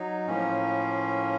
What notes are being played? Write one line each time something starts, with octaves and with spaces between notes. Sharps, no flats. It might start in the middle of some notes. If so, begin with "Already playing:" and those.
Already playing: F#3 D#4
A2 F3 A#3 C#4